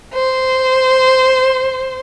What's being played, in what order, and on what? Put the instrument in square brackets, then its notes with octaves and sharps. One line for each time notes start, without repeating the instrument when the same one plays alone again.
[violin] C5